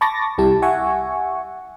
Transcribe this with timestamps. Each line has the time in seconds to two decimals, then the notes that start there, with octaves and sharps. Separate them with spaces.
0.01 A5 B5 C#6 D6 A6 A#6
0.38 C2 C3 G3 E4 G4 A5
0.62 E5 F#5 G#5 C#6